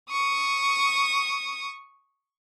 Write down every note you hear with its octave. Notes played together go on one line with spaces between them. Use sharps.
C#6 D#6